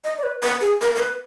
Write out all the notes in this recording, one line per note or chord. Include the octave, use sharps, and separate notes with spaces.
D#5
D5
B4
B4
G#4
A#4
A#4
B4